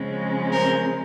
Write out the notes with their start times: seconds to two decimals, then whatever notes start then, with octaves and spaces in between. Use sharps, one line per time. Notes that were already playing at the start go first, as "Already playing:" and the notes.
Already playing: C#3 F3 G#3 C4
0.52 A#4 C5